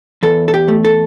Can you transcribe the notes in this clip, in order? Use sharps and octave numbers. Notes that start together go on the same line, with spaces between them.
E2 A4
A4
G4
A3
A4